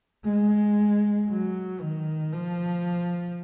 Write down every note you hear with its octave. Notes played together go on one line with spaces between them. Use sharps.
G#3
F#3
D#3
F3